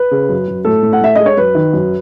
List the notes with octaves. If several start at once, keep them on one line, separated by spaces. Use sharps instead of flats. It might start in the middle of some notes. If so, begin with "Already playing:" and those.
Already playing: B4
C#3
F#2
F#2
A2 A4
A2
F#5
A2 E5
G#3 D#5
C#5
F#2 B4
D#3
F#2